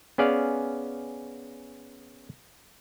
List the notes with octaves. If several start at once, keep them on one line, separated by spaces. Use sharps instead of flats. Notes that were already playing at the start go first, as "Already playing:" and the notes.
B3 C#4 G#4 D5 F5